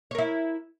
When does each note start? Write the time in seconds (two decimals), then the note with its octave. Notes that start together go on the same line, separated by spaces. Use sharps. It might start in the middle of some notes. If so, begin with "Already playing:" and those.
0.11 C#5
0.15 A#4
0.18 E4